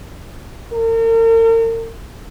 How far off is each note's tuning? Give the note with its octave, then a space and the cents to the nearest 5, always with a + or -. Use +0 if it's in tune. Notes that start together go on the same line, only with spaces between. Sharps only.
A#4 -40